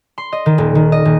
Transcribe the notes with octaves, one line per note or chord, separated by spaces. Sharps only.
C6
D#5
D#3
D#1
D#3
D#5
D#1